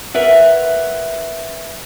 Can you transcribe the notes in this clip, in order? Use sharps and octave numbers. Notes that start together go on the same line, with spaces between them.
A#4 B4 E5 F#5